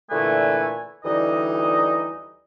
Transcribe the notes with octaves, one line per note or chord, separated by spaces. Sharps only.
A#2 D3 E3 A3 B4 G#5
D2 E3 G3 D#4 D#5